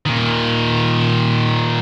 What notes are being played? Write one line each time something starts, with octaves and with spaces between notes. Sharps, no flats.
A#2 D#3